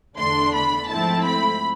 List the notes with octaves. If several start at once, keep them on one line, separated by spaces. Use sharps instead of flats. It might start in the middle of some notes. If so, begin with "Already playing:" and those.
E2 D3 A3 D4 C6
B5
G#2 F3 A3 C4 E4 A5
B5